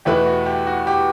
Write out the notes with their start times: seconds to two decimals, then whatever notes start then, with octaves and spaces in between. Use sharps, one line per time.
0.05 E2 B2 A3 E4 G4 B4
0.26 F#4
0.46 G4
0.67 F#4
0.87 G4